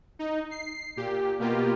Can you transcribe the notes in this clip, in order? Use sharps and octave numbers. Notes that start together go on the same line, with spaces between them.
D#4
C7
A#2 G4
B2 A#3 F4 G4